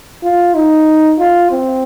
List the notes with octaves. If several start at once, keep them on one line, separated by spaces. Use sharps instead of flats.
F4
D#4
F4
C4